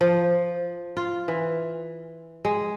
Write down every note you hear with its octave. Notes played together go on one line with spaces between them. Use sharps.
F3
F4
E3
G#3